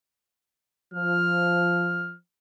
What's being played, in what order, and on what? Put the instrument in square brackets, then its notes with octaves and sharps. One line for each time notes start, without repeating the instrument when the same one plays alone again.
[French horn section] F3 [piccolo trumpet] F6